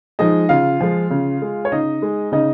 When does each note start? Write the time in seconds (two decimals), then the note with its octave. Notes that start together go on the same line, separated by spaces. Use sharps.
0.19 F3 G#3 D#4 D#5
0.49 C#3 F4 F5
0.80 F3 G#3
1.10 C#3
1.42 G#3
1.65 C#5
1.72 C#3 D#4 D#5
2.02 G#3
2.32 C#3 D#4 D#5